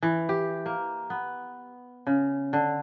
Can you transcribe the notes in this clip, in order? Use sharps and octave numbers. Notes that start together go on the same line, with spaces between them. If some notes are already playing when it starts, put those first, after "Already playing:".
E3
G4
A#3
B3
C#3
D3